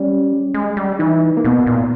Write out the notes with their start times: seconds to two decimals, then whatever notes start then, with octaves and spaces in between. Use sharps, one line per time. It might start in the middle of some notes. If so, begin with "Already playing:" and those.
Already playing: G3 C#4
0.54 G#3
0.77 G3
0.99 E3 D#4
1.37 A#3
1.44 B2 B3
1.67 A#2